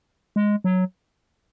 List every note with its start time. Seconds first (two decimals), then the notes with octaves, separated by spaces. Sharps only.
0.36 G#3
0.64 F#3